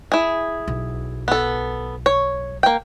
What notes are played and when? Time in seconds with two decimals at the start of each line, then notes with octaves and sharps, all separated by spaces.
0.12 E4 G#4
0.68 B1
1.28 B3 A4
2.06 C#5
2.63 A#3 G5